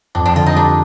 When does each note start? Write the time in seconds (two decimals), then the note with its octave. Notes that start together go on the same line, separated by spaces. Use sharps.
0.15 F2 D4
0.26 D4
0.35 D3 F4
0.46 D#4
0.56 G3 D4